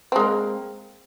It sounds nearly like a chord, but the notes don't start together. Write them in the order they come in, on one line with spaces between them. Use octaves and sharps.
C4 G#3 A#3